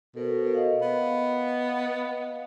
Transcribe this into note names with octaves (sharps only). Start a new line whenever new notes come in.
B2 A4 A#4 C5
D#5 F5
B3